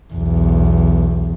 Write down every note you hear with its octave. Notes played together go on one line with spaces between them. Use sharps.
B1 E2